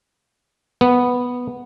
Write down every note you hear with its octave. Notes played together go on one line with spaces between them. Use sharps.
B3